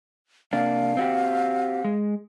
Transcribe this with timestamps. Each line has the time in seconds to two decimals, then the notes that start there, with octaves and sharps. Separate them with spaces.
0.53 C3 A#3 D4 F5
0.97 C4 F#4 G4
1.84 G#3